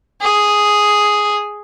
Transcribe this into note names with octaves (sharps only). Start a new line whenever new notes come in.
G#4